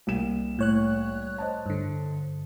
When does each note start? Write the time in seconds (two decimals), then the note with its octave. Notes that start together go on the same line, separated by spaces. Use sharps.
0.07 C2 A#3 E7
0.59 A2 C#5 F#6
1.38 C5 D#5 A5
1.66 G2 D3